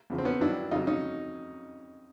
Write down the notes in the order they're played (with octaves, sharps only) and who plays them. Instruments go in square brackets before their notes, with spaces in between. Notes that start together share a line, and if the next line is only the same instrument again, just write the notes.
[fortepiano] E2 C#3 F3
C4
B3 C#4
G2 D#3 F#3 D4 E4
F2 C#3 F#3 D#4 F4
C#4 D#4